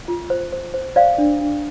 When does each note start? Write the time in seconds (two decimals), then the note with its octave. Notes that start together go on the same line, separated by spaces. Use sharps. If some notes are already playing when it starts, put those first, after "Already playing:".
0.08 F4
0.30 C5
0.52 C5
0.74 C5
0.96 C5 D5 F5
1.18 D4
1.41 D4